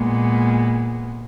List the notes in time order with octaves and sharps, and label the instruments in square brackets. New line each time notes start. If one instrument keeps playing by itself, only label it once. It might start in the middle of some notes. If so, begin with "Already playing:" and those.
Already playing: [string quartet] A#2 G#3 B3